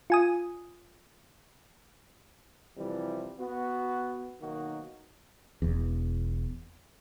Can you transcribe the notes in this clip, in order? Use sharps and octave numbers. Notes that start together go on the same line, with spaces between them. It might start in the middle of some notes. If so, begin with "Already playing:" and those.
F4 G#5 D#6
C3 E3 F3 G3
B3 F#4
B1 D#3 A#3 D#4 F#4
E1 E2